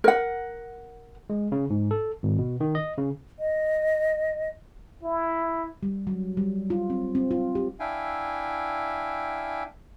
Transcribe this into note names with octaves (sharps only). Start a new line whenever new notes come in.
A#4 F#5
G#3
C#3
G#2
A4
G#1
B2
D#3
D#5
C#3
D#5
E4
G3
F#3
G3
F4
C4
C4
F4
G4
D4 E4 E5 F5 G5 G#5